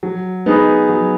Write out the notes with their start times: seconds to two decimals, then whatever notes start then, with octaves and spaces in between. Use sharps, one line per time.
0.03 F#3
0.46 B3 D#4 G#4 B4
0.89 F#3